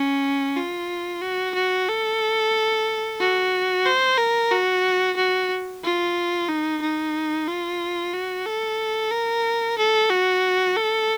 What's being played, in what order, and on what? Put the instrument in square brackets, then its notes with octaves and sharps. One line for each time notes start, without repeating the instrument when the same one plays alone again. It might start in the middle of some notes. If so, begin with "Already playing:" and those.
Already playing: [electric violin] C#4
F4
F#4
F#4
A4
F#4
C5
A#4
F#4
F#4
F4
D#4
D#4
F4
F#4
A4
A#4
A4
F#4
A4